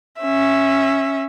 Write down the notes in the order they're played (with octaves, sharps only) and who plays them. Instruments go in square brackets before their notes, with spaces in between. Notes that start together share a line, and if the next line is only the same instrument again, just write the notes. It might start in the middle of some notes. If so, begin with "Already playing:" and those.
[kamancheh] C#4 E5